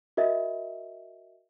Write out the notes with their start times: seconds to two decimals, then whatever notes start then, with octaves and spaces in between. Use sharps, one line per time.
0.17 F#4 A#4 D#5 E5